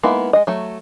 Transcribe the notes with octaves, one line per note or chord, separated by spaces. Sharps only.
G#3 A#3 B3 D#4 E4
G#3 D#5
F#3 A3